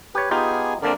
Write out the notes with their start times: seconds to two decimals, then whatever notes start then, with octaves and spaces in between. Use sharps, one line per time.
0.15 G4 B4 C#5
0.31 B3 D#4 F4 G4 G#4 G#5
0.82 D3 A#3 C4 D4 A#4 D5